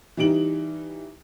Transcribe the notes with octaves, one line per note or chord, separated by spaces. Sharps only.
E3 G3 D#4 D7 F#7